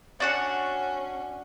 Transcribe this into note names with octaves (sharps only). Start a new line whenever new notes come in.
C#4 D4 F#4 F#5